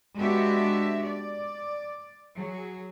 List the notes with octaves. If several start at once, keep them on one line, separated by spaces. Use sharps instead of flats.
G#3 B3 D4 F#4 G4 E5
D5
F#3 G#4